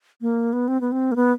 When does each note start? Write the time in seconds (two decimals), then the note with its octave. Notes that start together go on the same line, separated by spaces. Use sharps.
0.21 A#3
0.53 B3
0.68 C4
0.81 B3
0.92 C4
1.12 A#3
1.16 B3